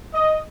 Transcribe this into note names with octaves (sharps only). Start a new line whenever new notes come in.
D#5